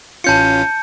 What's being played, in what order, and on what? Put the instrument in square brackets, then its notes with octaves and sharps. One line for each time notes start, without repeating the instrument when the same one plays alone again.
[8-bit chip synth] A1 C#4 F4 [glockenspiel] A5 G6 C#7